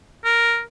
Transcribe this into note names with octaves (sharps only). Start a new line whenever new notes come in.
A#4